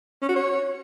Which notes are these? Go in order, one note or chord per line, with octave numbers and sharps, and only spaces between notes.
C#4
F#4
C#5